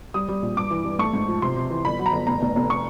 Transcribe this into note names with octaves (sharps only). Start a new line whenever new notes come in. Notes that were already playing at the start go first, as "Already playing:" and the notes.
G3 D#6
G3
A#1
G2 D6
E3
G2
A3 C#6
G#2
F3
C3 C6
C3
E3
G1 B5
F#3
A#5
G1
F1 A#5
F1
F1
C#6